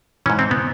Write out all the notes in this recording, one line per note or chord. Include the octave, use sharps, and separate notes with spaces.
G#2 E3 C#4
C4
B3